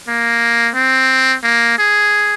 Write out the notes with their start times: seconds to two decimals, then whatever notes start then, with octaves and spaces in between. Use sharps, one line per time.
0.08 A#3
0.75 C4
1.44 A#3
1.78 G#4